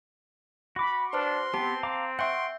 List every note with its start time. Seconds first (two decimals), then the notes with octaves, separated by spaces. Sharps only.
0.76 F#4 B5 D6
1.13 D4 B4 C5 C6 F6
1.54 B3 C4 G4 A5
1.83 F5 A#5 D6
2.19 E5 F#5 G5 C6 C#6 G6